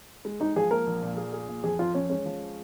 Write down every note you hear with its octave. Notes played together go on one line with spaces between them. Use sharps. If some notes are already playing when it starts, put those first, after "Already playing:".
G#3
G#3 D#4
F3 G#4
A#3 A#4
A#1
A#2
G#4
G#4
A#2
F2 G#4
F2 F4
F2 C#4
G#3 C#4
F3